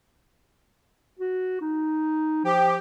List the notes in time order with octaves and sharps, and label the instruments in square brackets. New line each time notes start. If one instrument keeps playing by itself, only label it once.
[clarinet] F#4
D#4
[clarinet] F3 [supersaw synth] G4